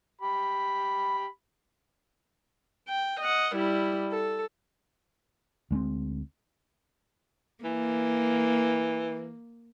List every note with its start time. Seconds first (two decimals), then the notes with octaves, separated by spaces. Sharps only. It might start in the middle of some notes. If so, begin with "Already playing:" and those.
0.21 G4 B5
2.89 G5
3.20 D#5 F#5
3.55 G3 E4
4.11 A4
5.71 D2 G#3 B3 C4
7.64 E3 A#3